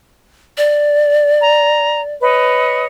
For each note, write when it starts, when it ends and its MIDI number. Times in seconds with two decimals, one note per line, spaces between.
0.57 2.15 74
1.41 1.99 82
2.22 2.85 71
2.22 2.85 73
2.22 2.85 75